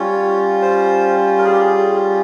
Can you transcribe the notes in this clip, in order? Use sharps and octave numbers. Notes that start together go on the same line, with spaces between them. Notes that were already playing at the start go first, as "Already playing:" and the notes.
Already playing: G3 C#4 F4 C#5
C5
A#4
G#4
G4
G#4